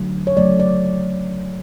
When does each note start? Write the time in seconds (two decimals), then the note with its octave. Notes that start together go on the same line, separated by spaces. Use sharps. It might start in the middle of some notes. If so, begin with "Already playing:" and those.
Already playing: D3 F#3 A3
0.27 C#5
0.36 C#3 F#3 A3 D5
0.60 D5